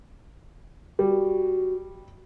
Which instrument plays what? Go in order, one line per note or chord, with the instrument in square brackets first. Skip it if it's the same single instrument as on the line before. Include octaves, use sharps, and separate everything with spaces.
[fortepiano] G3 [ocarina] F#4